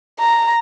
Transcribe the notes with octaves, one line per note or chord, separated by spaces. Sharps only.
A#5